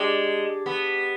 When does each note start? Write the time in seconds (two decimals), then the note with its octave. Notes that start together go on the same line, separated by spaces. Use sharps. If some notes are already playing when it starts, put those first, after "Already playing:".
Already playing: G#3 D4 G4 D5
0.66 B3